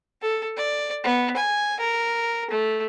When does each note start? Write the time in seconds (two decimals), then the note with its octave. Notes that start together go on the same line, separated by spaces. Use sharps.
0.22 A4
0.57 D5
1.04 B3
1.36 G#5
1.80 A#4
2.50 A3